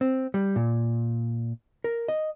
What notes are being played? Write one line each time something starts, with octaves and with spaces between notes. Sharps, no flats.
C4
G3
A#2
A#4
D#5